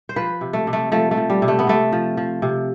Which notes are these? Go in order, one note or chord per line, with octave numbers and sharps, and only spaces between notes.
C5
F3 B4
C3
A3
C3
A3
F3 A3
A3
F3
G3
C3
A3
B3
C3 A3
F3
F3
C3